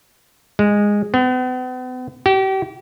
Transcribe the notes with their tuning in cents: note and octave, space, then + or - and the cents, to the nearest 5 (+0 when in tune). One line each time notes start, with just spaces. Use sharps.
G#3 -10
B3 +45
G4 -35